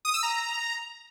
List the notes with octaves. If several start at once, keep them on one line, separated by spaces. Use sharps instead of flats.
D#6
E6
A#5